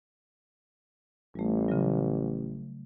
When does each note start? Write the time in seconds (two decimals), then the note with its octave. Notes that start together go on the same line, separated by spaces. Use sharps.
1.35 A1 G3 A3
1.69 C#3 F#3